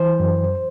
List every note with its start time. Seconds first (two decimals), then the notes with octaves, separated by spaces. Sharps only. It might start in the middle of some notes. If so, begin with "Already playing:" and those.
Already playing: E3 C5
0.20 F#2